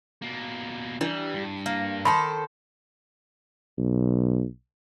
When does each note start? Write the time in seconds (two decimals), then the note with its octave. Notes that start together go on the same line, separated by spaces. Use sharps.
0.22 B2 A#3
1.01 E3 G3 D4 E4
1.34 G2
1.66 A#3
2.05 D#3 A4 C5 B5 C6
3.78 B1